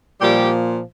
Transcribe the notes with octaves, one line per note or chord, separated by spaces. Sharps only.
A#2 F3 G3 G4